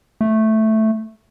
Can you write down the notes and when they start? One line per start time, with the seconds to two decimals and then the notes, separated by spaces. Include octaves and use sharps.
0.21 A3